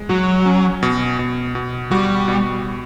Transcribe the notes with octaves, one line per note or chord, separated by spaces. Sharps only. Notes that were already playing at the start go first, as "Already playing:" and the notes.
Already playing: G#3
F#3 F#4
C#4
B2
B2
B2
G3 F#4
B2